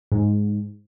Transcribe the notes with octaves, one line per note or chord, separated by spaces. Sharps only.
G#2